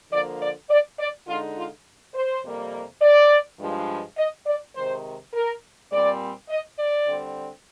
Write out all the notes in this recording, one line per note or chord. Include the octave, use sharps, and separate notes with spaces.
D3 F3 A#3 D5
D5
D5
D5
D3 G#3 D#4 F4
F4
C5
F2 C3 G3 A#3
D5
G2 F3 G#3
D#5
D5
C3 D#3 G#3 C5
A#4
A#2 G3 C4 D5
D#5
D5
D3 G3 C4